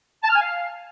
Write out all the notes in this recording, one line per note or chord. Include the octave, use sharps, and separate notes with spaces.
A5
F6
G#5
F5